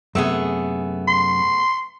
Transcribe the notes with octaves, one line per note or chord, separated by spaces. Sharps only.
F#2 C3 A3 B3 G#4
C6